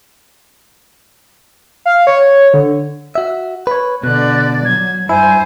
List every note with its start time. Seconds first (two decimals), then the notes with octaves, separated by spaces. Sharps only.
1.86 F5
2.07 C#5
2.54 D3
3.15 F#4 E5
3.67 B4 C#5
4.04 B2 D3 D5 F#6
4.65 F#3 G#6
5.09 G2 E4 C5 G#5